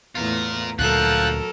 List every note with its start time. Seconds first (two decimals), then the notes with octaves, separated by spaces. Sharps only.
0.15 E2 A2 F4 A#4
0.79 D2 A#2 F3 F#3 A4 A#4 F#6